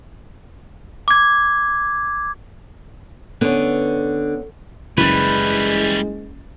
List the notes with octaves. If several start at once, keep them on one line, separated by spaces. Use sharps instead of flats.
D6 G#6
D3 B3 C#4
F#1 E3 G3 G#3 B4 A6